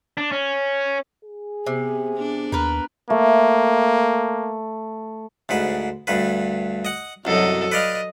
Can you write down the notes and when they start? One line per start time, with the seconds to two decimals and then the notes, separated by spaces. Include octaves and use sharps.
0.17 D4
0.32 C#4
1.25 G#4
1.66 C3 B3
2.15 B3 D4
2.52 D#2 A#4 B4
3.10 A3 A#3
5.49 D2 G#2 B4
6.07 D2 G2 B4
6.85 D#5 F#5
7.25 C2 F#2 F#3 A4 D#5
7.72 B4 D5 D#5 F5